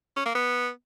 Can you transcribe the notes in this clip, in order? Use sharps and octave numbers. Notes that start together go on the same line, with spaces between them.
C#4
A#3
B3